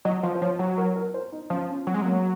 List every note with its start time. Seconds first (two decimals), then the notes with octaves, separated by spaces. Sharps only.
0.05 F#3 D#5
0.23 F3 C5
0.35 C5
0.41 F3 C#5
0.59 F#3 C#5
0.78 A#4
0.96 A#4
1.14 C5
1.32 D#4
1.50 F3 C#4
1.69 C#4
1.87 F#3 C4
1.94 G#3
2.02 F#3 A#3